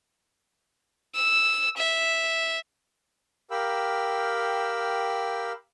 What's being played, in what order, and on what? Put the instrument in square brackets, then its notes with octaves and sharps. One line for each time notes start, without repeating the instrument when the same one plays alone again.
[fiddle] E6
E5
[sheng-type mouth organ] G4 A#4 F5 G5 B5 E6